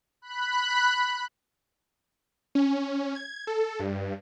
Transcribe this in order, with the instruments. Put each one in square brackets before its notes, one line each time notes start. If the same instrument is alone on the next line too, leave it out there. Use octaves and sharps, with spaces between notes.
[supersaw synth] B5 F#6
C#4
G#6
A4
G2